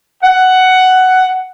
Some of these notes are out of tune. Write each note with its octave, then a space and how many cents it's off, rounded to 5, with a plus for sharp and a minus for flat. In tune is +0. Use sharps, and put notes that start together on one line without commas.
F#5 +10